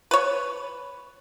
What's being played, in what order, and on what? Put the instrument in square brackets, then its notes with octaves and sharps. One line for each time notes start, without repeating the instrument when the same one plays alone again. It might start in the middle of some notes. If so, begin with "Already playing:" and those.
[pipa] B4 C#5